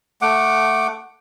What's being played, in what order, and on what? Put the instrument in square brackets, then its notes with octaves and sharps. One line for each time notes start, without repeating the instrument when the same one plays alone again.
[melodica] A3 F#5 D6